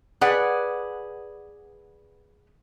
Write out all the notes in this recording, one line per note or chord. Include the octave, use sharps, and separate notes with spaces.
G#4 B4 D5 F#5